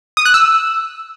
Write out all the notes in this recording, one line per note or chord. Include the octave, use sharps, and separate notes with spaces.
D#6
F#6
E6